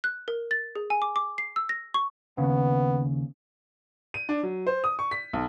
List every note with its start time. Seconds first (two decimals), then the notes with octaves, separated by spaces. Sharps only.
0.04 F#6
0.28 A#4
0.51 A6
0.76 G#4
0.90 G#5
1.02 D6
1.16 D6
1.38 C7
1.56 E6
1.69 A#6
1.94 C#6
2.38 D#2 C#3 B3
4.14 D#7
4.29 D4
4.43 F#3
4.67 C5
4.84 D#6
4.99 C#6
5.11 B6
5.33 B1